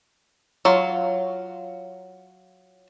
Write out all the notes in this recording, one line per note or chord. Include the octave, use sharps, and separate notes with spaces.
F#3 F4